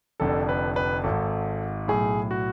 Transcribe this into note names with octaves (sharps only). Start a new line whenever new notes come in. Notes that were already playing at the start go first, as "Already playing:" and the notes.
F1 F2 D3 A4
B4
B4
G#1 G#2 A4
B1 A2 G#4
F#4